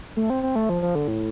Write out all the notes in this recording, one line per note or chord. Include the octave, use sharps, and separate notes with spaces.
A3
C4
C4
A3
F3
F3
D3
A2